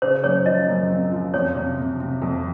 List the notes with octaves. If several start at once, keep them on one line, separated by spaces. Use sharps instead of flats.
C#3 C5
F#2 C#5
F3 D#5
F#2
C4
F3
F2 C#5
C3
C3
C3
F2